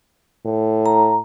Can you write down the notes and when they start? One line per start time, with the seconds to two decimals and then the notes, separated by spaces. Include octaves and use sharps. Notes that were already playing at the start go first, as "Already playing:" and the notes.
0.46 A2
0.86 A#5